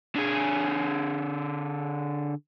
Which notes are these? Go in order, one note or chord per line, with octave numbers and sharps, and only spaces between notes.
D3 G#4